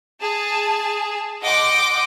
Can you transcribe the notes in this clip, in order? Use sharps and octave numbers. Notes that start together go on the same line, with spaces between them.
G#4 A5
D#5 F#5 G5 C6 D6